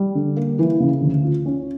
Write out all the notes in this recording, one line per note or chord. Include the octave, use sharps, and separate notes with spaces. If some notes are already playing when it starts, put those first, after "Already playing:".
Already playing: G3
D3
A#3
E3
C#3
D2
F4
C#4